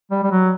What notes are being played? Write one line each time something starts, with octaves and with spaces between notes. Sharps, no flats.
G3
G3
F#3